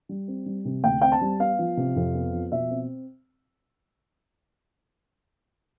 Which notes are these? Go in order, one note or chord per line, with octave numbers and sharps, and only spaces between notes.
G3
C4
G3
C3
D2 G5
C4 G5
A5
G3
B3 F5
F3
C3
F2
B3
F3
B2 E5
C4